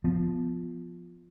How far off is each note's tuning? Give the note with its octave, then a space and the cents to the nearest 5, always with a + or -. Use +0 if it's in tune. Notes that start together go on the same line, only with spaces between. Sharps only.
F3 +0 B3 +15